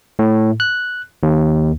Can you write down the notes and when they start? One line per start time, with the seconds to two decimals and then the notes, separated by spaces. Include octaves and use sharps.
0.19 A2
0.60 F#6
1.23 D#2